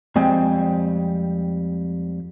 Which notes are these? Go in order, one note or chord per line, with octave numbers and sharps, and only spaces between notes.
F2 G3 G#3 C4 G#5